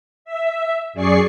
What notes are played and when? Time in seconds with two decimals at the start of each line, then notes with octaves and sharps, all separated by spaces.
0.25 E5
0.93 F#2 G#4 D5 C#6 C7